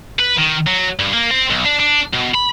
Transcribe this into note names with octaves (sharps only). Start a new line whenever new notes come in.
B4
D#3
F#3
G2
A#3
C4
B1
D4
D4
B2
B5